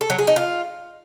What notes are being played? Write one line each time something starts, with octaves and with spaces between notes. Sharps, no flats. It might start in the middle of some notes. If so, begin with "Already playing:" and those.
A4
F#3
G#4
D#4
F4